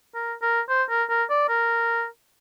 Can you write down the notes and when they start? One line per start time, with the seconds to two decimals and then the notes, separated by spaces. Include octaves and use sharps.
0.15 A#4
0.42 A#4
0.69 C5
0.90 A#4
1.10 A#4
1.30 D5
1.49 A#4